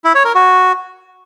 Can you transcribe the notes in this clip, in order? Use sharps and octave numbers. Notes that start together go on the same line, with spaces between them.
E4
C#5
A#4
F#4